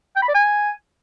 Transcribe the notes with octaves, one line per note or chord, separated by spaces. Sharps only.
G5
B5
D5
G#5